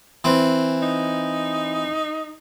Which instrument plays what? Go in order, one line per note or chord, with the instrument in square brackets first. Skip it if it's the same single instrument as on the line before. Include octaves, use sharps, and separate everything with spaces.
[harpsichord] E3 C4
[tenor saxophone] D#4